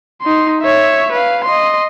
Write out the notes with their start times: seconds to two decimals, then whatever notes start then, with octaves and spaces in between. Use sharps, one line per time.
0.22 D#4 C6
0.61 C#5 E5
1.13 B4 F5
1.45 D#5 C6